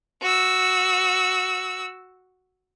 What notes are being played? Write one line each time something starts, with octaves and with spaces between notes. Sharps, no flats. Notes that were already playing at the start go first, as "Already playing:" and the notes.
F#4 E6